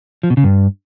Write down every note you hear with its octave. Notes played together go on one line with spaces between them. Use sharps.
F3
B2
C#3
G2